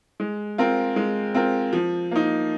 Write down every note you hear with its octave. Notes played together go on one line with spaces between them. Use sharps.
G#3
C4 F4 A#4
G#3
C4 F4 A#4
F3
A#3 D#4